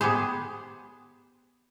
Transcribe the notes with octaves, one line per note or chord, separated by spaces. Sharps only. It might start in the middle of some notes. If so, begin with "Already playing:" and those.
B3 G4 G#4 C5